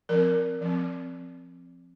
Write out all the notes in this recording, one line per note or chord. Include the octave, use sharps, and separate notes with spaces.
F3 C4 A#4
F3 C4